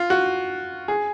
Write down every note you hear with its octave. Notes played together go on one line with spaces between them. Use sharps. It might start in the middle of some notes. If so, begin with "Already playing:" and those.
Already playing: F4
F#4
G#4